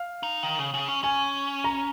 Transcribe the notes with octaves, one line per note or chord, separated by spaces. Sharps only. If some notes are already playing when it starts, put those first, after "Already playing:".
Already playing: F5
D#4
D#3
C#3
C#3
C#4
C#4 G#5
A#5